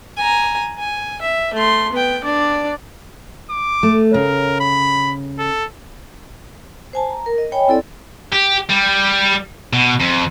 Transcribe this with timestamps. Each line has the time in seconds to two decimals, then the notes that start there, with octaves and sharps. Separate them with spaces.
0.18 G#5 A#5
0.79 G#5
1.21 E5
1.54 A3 C6
1.93 B3 G5
2.24 D4 D5
3.50 D6
3.83 A3
4.14 C#3 A#4
4.60 B5
5.39 A4
6.93 C5 G#5 A5
7.10 A#5
7.26 A#4
7.38 D#5
7.52 C#5 D#5 G5 G#5 B5
7.68 C4 E4 A4 D5
8.32 G4
8.69 G3
9.73 B2
10.00 F2